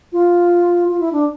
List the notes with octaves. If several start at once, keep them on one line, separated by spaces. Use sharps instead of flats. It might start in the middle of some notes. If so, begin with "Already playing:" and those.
F4
F4
E4
D4